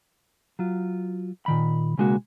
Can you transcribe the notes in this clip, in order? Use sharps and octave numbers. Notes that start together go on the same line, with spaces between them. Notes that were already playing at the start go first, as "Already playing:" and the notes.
F#3 F4
A#2 D#3 B5
B1 C#3 G#3 A#3 F#4